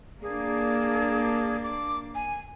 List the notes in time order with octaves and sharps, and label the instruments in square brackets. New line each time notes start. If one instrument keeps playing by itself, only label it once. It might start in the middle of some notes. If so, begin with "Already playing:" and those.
[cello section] A#3 D4 [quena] G#4
[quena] D6
G#5